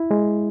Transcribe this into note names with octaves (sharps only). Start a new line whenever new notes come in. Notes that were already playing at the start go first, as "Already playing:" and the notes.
Already playing: E4
G#3